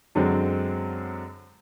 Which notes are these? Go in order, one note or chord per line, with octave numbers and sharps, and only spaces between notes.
F#2 D3 F#3 G#3 C4